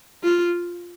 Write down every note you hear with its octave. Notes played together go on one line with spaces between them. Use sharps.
F4